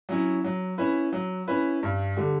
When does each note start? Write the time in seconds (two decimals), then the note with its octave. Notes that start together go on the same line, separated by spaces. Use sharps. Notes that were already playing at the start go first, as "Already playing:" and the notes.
0.09 F#3 C#4 E4
0.44 F#3
0.78 C#4 E4 B4
1.13 F#3
1.48 C#4 E4 B4
1.83 G2
2.17 D3 G3